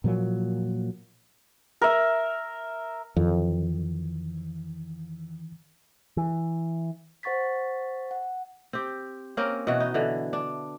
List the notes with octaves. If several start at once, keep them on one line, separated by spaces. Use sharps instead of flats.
A#2 F3 F#3 A#3
A#4 E5
F2 D#3 E3
E3
C5 F#5 C#6 A6 B6
F#5
C4 G4
A#3 C4 C#4 A#4
B2 E3 F#4
D#4
D3 E3
D4